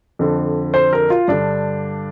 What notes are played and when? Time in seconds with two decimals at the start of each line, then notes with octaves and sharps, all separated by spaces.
0.19 F2 D3
0.74 C5
0.93 A#4
1.10 F4
1.28 G2 D3 D4